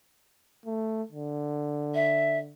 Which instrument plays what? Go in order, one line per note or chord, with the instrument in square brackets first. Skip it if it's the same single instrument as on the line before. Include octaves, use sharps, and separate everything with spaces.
[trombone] A3
D3
[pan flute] E5